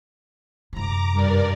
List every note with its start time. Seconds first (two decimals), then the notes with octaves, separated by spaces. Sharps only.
0.73 F#2 C3 A#5 D6
1.13 G2 A#4 D5